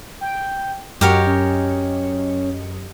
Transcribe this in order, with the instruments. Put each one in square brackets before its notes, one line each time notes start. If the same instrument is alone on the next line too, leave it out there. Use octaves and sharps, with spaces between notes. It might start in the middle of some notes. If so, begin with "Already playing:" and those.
[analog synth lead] G5
[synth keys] F#2 D#5 C#7 [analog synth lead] F#4 [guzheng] G4 A#4 C#5
[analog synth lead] C#4